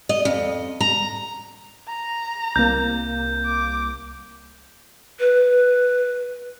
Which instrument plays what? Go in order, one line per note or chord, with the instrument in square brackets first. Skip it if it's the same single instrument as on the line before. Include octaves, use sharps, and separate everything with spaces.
[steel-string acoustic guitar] D#5
F2
A#5
[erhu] A#5
[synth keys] C2 A#3 [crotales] G6
[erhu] D6
[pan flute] B4